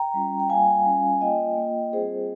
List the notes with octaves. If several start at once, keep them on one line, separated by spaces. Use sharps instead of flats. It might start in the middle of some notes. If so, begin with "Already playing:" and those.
Already playing: G5 A#5
G3 C#4 F4
G5
G3 A#3 F4 F5 G#5
G3 C#4 F4
A#3 F4 D#5 G5
A#3 F4
G3 C4 F4 G#4 C5